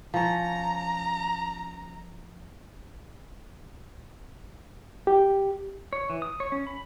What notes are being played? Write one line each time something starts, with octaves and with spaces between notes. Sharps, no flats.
F3 C#4 A#5
G4
C#5
E3
D#6
C#5
C#4
B5